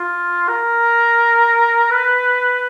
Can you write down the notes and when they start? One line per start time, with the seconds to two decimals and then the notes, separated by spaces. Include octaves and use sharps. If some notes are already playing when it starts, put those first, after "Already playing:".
Already playing: F4
0.48 A#4
1.91 B4